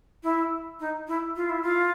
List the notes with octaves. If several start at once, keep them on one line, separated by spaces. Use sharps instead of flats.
E4
D#4
E4
F4
E4
F4